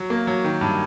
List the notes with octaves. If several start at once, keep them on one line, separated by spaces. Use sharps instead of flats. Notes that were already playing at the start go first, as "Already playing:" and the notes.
Already playing: F#3
A#3
F#3
D#3
G2